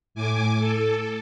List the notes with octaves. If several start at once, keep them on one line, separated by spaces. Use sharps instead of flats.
A2 G#5 D6
A4